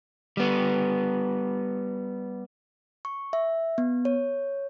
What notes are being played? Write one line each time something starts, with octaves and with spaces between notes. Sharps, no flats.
G3 B3
C#6
E5
B3
C#5